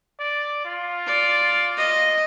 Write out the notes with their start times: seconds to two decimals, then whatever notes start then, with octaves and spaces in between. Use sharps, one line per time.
0.20 D5
0.65 F4
1.07 D5
1.77 D#5